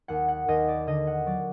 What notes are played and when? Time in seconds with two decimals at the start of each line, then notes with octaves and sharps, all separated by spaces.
0.08 D#2 F#5
0.28 F#5
0.48 D#2 D#5
0.69 D5
0.87 D3 D#5
1.07 F#5
1.26 F#3 D5